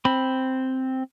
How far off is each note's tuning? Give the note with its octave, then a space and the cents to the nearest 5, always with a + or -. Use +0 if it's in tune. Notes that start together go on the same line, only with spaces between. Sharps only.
C4 +0 B5 +0